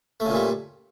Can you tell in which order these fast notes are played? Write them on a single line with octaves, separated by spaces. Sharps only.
A3 C#3 A#2 G3